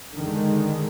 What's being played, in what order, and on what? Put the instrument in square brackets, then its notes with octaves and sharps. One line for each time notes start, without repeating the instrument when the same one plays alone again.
[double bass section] D3 D#3 G#3